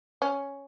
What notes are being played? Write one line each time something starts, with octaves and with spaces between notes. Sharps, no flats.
C#4